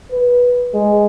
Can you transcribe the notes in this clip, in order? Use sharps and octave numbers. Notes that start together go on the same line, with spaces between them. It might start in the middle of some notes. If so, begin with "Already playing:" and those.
B4
G#3